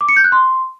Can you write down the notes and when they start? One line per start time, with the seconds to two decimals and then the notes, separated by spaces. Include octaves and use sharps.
0.01 D6
0.09 C#7
0.16 G6
0.24 F#6
0.32 C6